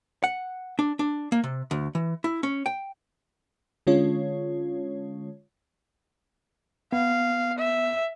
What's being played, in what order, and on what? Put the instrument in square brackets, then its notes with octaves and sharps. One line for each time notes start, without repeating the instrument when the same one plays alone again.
[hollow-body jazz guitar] F#5
D4
D4
A#3
C3
D2
E3
E4
C#4
G5
[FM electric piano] D3 G#3 C#4 F4 C#5
[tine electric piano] B3 [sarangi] F5
[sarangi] E5